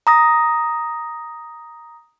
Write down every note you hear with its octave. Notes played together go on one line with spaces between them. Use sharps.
A#5 D#6 A#6